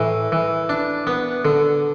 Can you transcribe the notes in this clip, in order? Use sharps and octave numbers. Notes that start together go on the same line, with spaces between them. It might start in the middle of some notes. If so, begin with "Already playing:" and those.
Already playing: A2 E3
E3
D4
B3
D3